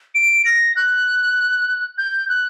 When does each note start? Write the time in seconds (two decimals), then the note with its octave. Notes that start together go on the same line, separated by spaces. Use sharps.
0.14 D7
0.44 A#6
0.75 F#6
1.97 G6
2.28 F#6